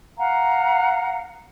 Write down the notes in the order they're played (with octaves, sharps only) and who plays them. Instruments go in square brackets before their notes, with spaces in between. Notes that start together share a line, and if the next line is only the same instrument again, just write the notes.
[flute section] F5 F#5 A#5